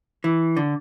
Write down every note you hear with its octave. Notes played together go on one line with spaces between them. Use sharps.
E3
D3